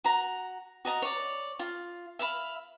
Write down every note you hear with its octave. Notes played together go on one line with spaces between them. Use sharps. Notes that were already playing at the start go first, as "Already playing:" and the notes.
F#4 A#5
F#4 D#5 A5 A#5
C#5 D5
F4
E5 F5 B5